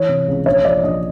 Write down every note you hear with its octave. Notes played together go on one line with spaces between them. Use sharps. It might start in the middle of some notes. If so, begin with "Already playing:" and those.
Already playing: E3 C#5
C3
C#2
A#1 C#5
F3 D5
A#1 D#5